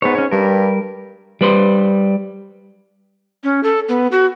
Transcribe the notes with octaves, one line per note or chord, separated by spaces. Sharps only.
G#2 B3 C#5
C#4 C#5
G2 G3 A#4
G3 B4 C5
C#4
A4
B3
F#4